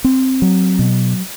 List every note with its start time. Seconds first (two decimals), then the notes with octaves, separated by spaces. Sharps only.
0.04 C4
0.42 F#3
0.79 B2